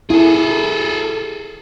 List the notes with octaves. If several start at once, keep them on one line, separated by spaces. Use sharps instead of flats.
E4 G#4 A4